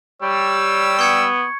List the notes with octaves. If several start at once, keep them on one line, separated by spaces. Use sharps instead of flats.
G3 C#5 E6
B3 C#6 G#6 C#7